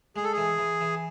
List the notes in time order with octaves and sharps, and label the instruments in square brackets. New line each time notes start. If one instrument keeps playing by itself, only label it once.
[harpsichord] G#3 [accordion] G#4
[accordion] A4
[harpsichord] E3 [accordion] G#4
[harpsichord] E3
E3